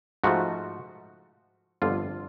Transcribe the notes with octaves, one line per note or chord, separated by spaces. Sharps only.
G#2 F3 A3 F#4
G1 F2 D3 F4